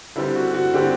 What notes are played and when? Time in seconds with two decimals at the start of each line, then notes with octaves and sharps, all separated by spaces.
0.16 D3 G3 C4 E4
0.36 F#4
0.54 F#4
0.73 D3 G3 C4 G4